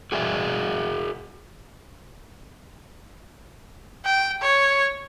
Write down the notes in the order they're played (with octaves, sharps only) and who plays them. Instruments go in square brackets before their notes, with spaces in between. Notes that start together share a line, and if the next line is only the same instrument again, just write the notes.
[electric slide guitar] F#4 G#4 D5 E5
[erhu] G5
C#5